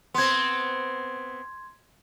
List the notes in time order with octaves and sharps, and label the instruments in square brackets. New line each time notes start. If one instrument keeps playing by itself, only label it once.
[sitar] B3 C4 [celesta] C6 G#6